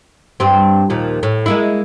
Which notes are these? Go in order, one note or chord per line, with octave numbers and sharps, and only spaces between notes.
G2 C4
D#2 A#2 F3
A2
G#3 A#3 E4